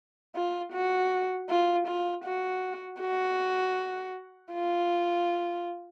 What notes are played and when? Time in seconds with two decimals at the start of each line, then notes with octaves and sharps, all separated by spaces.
0.35 F4
0.73 F#4
1.49 F4
1.87 F4
2.25 F#4
3.01 F#4
4.54 F4